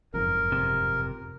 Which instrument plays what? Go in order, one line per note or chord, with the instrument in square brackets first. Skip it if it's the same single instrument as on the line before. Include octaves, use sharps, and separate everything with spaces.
[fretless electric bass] F#1 F2 G#2 [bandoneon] A#4
[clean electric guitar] C3